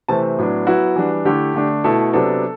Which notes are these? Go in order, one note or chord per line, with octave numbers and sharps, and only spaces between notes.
C3 E3 A3 C4 A5
A2 F#3 B3 D4
F#3 B3 E4 F#4
E3 G3 D4
D3 A3 E4 G4
D3 A3 D4
B2 A3 E4 A4
C3 F#3 B3 D4 A4